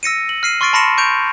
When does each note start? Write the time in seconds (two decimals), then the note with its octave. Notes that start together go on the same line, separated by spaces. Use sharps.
0.03 E6 A#6 C#7 D#7
0.29 F#7
0.43 F6 C7 D#7
0.61 C6 C#6 F6 A6 C7 D7
0.73 A5 B5 C6 A#6 C#7 E7
0.98 C#6 G6 D7 F7